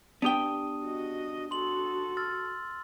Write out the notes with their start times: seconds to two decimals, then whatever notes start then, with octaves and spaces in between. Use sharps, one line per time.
0.22 B3 D4 G4 G5 D#6
0.82 F#4 D#5
1.51 F#4 A4 C6 F#7
2.17 E6 F6 A6